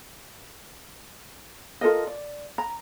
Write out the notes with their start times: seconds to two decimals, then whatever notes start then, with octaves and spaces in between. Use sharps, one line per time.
1.81 F4 A4 A#4 D#5
2.07 D5
2.58 A#5